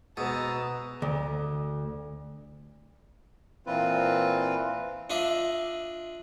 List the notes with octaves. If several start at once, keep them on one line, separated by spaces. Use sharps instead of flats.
B2 G#3 B3 D#5 A5 A#5 D#6 E6
D2
A#2 E3 C4 F4 B4
D4 F4 D#5 E5